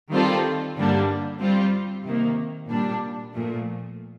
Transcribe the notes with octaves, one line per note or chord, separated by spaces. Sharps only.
D#3 G3 C4 F4 A4
G2 D3 G3 A#3 D4
G3 C4 F4
C3 D#3 A#3
A#2 G3 D4
A#2 F3 A3